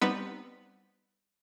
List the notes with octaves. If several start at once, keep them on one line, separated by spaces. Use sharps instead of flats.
G3 B3 C4 D#4 B4